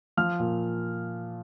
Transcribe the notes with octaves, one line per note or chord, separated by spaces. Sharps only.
F3 F6
A#2